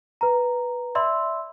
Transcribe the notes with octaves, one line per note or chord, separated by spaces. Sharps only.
B4 A#5
D5 E5 B5 C6 E6